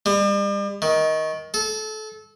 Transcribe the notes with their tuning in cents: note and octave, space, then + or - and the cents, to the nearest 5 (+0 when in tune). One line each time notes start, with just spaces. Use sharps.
G3 +40
D#3 +15
A4 -25